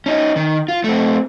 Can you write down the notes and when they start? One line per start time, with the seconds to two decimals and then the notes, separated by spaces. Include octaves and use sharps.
0.06 C#4 D#4
0.36 D#3
0.68 F4
0.84 A3 C4